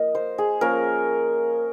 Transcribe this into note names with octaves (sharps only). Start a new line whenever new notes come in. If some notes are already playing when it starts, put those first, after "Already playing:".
Already playing: F3 A#3 D#5
C5
G#4
F3 A#3 C#4 A#4